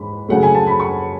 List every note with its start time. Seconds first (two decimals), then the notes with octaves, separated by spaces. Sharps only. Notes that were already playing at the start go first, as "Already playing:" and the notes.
Already playing: G#2 E3 B5
0.29 C#3 F#3 A3 F#5
0.43 G#5
0.55 A5
0.67 B5
0.80 C#6